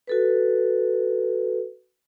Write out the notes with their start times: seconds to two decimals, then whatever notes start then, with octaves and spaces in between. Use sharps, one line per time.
0.07 F#4 A4 B4